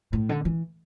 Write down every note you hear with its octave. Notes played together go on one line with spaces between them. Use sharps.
A2
D3
E3